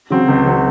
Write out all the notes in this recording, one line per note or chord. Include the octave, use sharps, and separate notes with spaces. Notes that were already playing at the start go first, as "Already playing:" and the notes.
C#3 F#3 C4
C#2
C#3 F#3 C4